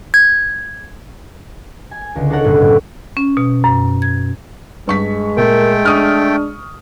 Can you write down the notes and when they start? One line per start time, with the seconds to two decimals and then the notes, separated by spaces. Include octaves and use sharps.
0.14 G#6
1.91 G#5
2.16 C#2 D3
2.30 D4 D#4 A4 A#4 C#5 F#5
2.44 F#1 B1 A2 C#4
2.61 A2
3.17 C#4
3.37 B2
3.64 F#2
4.02 G#6
4.87 G2 G#3 C#6 B6
5.37 A#2 A3 A#4 G5
5.85 D4 C#6 D#6 F6